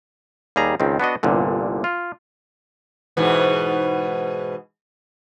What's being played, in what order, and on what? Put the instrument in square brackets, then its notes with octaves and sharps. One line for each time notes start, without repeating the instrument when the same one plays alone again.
[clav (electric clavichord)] D#2 G3 G#4 A#5
C#2 D#3 C4
B3 D4 F#4 D#5
G1 C2 A#2 D3
F4
[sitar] G#2 B2 E3